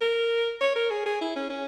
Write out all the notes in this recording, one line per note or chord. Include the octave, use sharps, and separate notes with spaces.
A#4
C#5
A#4
G#4
G#4
E4
C#4
C#4